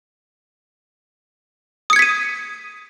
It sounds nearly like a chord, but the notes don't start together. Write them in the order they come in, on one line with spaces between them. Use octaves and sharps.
D#6 C#7 G#6 B6 D#7